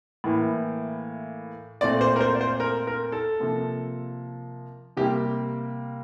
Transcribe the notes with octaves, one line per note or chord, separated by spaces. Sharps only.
A2 E3 A#3
A#2 A3 C4 D5
C5
A#4
C5
D5
C5
A#4
A#4
A4
C3 F3 A#3
C3 G3 A#3 G4